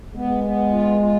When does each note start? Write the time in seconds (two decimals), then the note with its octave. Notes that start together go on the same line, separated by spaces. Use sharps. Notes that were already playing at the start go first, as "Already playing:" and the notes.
0.15 G#3 B3
0.44 B3
0.72 F4
1.01 F4